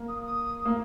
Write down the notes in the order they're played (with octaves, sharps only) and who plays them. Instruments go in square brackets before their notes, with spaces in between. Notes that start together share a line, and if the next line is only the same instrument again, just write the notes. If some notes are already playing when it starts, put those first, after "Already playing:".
Already playing: [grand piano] A#3
[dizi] D#6
D#6
[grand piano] A#3